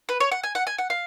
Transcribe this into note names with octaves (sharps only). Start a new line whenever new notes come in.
B4
C#5
F#5
G#5
F#5
G#5
F#5
F5